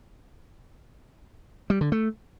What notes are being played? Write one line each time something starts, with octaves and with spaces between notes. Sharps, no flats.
G3
D3
A3